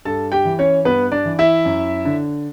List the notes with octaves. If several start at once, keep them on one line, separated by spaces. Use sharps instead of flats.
G2 A4 A5
G4 G5
E3
C#4 C#5
G2 B3 B4
D4 D5
E3
E4 E5
F#2
D3